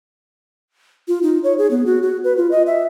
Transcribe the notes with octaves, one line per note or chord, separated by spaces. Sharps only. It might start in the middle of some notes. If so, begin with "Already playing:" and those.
F4
D#4
C#5
G#4
B3
F#4
F#4
B4
F4
D#5
E5